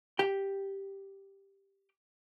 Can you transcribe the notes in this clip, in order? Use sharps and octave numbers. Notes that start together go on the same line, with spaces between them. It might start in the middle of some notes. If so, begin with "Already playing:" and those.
G4 G5